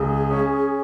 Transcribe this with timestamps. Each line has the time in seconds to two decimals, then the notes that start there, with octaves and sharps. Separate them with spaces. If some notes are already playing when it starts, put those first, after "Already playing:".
Already playing: C#2 G#4
0.31 C#4